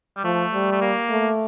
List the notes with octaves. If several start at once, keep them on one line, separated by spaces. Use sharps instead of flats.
G3
F3 A3
G3
A3
A#3
A3